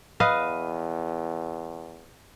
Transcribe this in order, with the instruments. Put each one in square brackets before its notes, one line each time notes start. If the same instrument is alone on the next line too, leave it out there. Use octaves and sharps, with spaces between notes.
[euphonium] E2 [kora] B4 D#5 F5